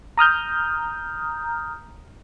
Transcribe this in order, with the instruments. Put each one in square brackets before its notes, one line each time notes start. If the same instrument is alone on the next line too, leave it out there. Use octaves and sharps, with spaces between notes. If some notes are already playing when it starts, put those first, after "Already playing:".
[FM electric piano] A#5 D#6 F6 G6